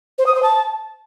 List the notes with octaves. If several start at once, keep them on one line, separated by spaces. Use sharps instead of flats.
C5
D#6
C5
A5